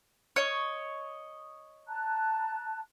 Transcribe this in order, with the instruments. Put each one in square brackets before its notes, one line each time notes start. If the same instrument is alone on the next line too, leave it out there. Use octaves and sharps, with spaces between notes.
[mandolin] C#5 D#5
[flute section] A5 A#5 F#6